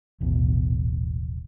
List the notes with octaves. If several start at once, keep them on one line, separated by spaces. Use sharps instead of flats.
D#1 A1 B2